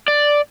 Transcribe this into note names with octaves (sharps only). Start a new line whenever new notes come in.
D5